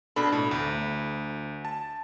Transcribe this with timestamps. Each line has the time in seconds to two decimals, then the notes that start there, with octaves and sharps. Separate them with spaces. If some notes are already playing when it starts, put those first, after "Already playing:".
0.16 B2 D4 A4 B5
0.32 A2
0.51 D2
1.65 A5